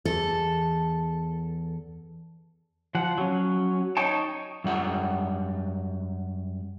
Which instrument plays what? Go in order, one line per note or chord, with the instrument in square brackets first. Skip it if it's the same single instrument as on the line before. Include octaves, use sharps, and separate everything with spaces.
[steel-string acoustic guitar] E2 A4
[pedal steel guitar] F3 F#5
F#3 C#4
D#4 C#5 G5 A5
[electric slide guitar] F#2 G3 F#5